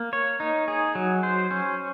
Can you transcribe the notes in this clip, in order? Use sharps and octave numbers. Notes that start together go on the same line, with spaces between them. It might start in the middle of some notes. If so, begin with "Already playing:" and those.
Already playing: A#3
C#5
D#4
G#4
F#3
C5
C#4